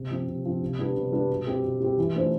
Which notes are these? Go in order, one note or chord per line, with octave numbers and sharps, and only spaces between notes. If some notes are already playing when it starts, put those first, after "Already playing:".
Already playing: C3
F3 C4
C3
F3 C4
C3
G3 B3 D4
C3
G3 B3 D4
B2
G3 C4 G4
B2
G3 C4 G4
E3
A3 D4 F4 C5